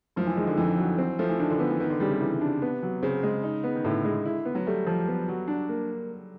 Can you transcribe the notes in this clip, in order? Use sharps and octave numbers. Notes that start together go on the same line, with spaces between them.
F#2 F3
E3
D#3 G#3
D3
F2 E3
F#3
C4
F3 A3
E3
D#3 D4
D3
D#3 B3
E3
D#3 B3
D3
C#3 G3
C3
E3
D4
B3
F#3
C#3 C4
G#3
D#4
B3
D#3
A2 D3
G#3
E4
B3
F#3
G3 A3
F3
B3
F#3
D4
A#3